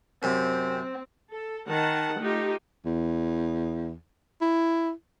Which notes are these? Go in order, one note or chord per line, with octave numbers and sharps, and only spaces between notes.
F#2 C3 C4
A4
D#3 F#5 A5
A3 D#4 F4 G4
E2
E4